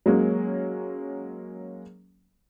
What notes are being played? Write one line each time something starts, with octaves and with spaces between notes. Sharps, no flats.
F#3 G#3 A#3 C#4